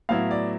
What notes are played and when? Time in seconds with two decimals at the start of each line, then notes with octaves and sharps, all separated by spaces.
0.09 A2 F#3 B3 E4 F5
0.31 D5